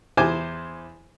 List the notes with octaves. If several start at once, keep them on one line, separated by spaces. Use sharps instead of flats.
E2 C5 G#5 C6 D6